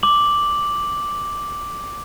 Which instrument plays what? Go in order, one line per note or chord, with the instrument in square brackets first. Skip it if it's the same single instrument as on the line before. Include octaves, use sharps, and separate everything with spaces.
[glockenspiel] D6 F#7